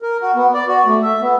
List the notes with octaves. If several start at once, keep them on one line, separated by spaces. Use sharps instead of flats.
A#4
F#4
B3
D5
F#4
A3
E5
B3